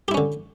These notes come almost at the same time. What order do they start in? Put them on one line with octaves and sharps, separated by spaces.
G4 E4 C#4 D3